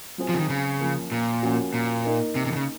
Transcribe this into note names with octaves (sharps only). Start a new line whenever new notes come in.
F#3 C4 F4 G#4 C5
F3
C#3
D#3
C#3
F3 A#3 C#4
A#2
F3 A#3 C#4 F#4
A#2
A#3 D#4 A#4
C3
C3
D#3
C#3